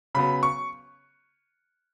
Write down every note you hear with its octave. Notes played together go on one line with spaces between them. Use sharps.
C#3 F#3 B3 B5
C#6